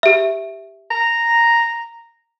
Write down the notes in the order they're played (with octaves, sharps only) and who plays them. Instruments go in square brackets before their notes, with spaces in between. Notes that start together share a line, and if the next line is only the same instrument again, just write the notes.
[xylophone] G4 E5
[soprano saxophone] A#5